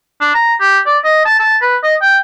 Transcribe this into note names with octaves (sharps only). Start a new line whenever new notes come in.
D4
A#5
G4
D5
D#5
A5
A5
B4
D#5
G5